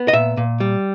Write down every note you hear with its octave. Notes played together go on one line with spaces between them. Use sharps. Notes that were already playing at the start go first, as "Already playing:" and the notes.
Already playing: B3
D#5
A#2 E5
A#2
G3